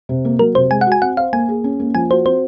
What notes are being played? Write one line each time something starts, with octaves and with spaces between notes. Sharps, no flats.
C3
A#3
F#3 A#4
C3 C5
G#3 G#5
F#5
F#4 G#5
C4 F#5
C5 F5
A#3 G#5
G#4
C#4
A#3
F3 G#5
F#4 C5
C4 C5